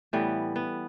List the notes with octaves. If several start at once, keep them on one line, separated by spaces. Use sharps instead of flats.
A2 E3 G3 B3
B3